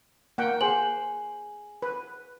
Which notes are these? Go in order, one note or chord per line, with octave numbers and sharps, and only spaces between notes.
A#3 F#5 G5
G#4 C5 G#5 F#7
B4